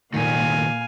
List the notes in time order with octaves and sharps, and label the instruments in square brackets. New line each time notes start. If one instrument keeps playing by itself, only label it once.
[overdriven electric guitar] C2 D#3 [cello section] A#2 [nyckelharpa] F5 G#5